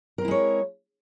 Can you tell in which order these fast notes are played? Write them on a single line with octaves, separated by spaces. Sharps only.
A#4 C4 E4 G#3 C#5